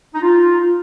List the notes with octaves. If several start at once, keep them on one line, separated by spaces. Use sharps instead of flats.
D#4
F4